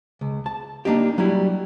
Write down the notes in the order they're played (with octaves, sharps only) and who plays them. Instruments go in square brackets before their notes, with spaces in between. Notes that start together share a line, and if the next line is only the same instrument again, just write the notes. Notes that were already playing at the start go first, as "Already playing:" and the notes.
[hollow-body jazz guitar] C#2
A5
A#3 D4 D#4 G4
F#3 G3 E4